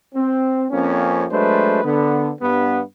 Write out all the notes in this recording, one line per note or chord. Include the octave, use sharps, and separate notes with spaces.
C4
F2 A#3 C4 C#4
F#3 G#3 A3 D4 B4 C5
D3 B3
G2 B3